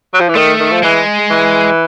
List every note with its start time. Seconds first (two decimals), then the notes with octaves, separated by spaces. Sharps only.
0.14 F#3
0.20 F3
0.29 E3
0.35 D#3 A3
0.59 D#3
0.72 F3
0.83 E3 G#3
1.30 E3